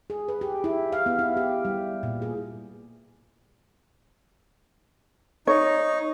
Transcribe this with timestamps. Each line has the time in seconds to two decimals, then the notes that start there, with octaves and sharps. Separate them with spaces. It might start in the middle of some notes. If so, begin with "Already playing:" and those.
0.10 G#4
0.28 B4
0.41 G4
0.64 E4
0.92 F5
1.06 B3
1.19 E4
1.37 G4
1.65 G3
2.03 A#2
2.22 G#4
5.47 D#4 C#5